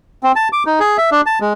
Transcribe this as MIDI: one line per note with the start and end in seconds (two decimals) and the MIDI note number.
0.23 0.32 60
0.36 0.48 81
0.53 0.63 86
0.66 0.79 63
0.80 0.97 68
0.98 1.10 76
1.12 1.21 62
1.26 1.39 81
1.41 1.53 56